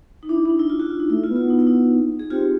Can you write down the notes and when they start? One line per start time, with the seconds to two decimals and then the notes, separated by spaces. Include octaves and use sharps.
0.23 D#4
0.29 D4 E4
0.42 D4 E4
0.50 D#4
0.59 E4
0.70 F4
0.80 E4 F#4
0.90 F4
1.00 D#4
1.10 A3 E4
1.24 F4
1.30 B3
1.36 F4
1.50 D#4
1.59 E4
1.67 D#4
2.19 G#4
2.30 C4 F4 G4